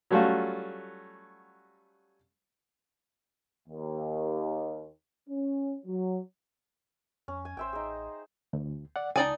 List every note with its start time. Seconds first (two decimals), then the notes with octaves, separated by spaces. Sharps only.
0.11 F#3 G3 A3 C#4 F4 F#4
3.68 D#2
5.29 C#4
5.86 F#3
7.28 F2 C#4
7.45 G#5
7.57 A1 C5 E5 G5
7.73 D#4 G#4
8.53 D2
8.96 D5 F#5
9.16 C#2 D#4 D5 G#5 A5 D#6